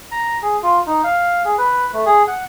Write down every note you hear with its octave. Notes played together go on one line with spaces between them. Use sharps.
A#5
G#4
F4
D#4
F5
G#4
B4
A3
G#4
F#5